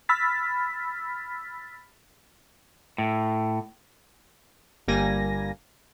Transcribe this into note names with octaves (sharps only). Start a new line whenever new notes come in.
B5 E6 F6 A6 B6
A2
G1 G3 A#3 G#5 A#6